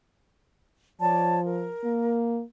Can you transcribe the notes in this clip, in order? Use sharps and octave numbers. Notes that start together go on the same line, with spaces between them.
F3 C#5 D5 A5
A#4
A#3